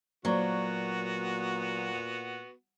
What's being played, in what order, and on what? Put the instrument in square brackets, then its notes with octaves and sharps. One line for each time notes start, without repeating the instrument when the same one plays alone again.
[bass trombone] A#2 [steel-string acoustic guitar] F#3 [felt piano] A#3 C5 D5 [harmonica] B3 F#4